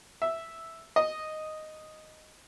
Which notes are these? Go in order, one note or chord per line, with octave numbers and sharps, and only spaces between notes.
E5
D#5